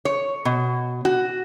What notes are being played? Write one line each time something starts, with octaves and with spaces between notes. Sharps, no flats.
C#5
B2
F#4